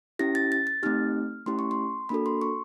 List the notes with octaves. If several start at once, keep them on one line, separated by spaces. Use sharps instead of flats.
C#4 E4 G4 A#6
A6
A6
A6
A3 C4 D#4 G4 F6
A3 C#4 E4 G4 C6
C#6
C6
A#3 D4 F#4 A4 B5
C6
C#6